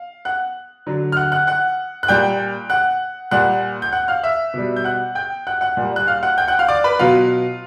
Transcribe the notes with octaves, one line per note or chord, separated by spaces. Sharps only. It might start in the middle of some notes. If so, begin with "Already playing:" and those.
Already playing: F5
F#5 F#6
D3 F#3
F6
F#5 F#6
F#5 F#6
F#5 F#6
F#6
A#2 G3 G5 G6
F#5 F#6
A#2 G3 F#5 F#6
G6
F#5 F#6
F5 F6
E5 E6
B2 G3
G6
F#5 F#6
G5 G6
F#5 F#6
F#5 F#6
A#2 G3
F#6
F5 F6
F#5 F#6
G5 G6
F#5 F#6
F5 F6
D5 D6
B4 B5
B2 F#3 F4 F5